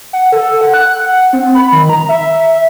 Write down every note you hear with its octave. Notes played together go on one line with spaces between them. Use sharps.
F#5
A4
F#5
F#6
F#5
C4
B5
D#3
A#5
E5